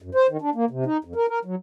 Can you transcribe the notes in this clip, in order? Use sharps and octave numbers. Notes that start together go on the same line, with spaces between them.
F#2
C5
D#3
D4
A#3
C3
D#4
F2
A#4
A#4
F#3